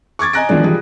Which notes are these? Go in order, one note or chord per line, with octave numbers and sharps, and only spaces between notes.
C#6 D6 G#6 A6
D#5 G#5 A#5 F#6 A#6 D7
B2 D#3 F3 G#3 D4
F3 G3 G#4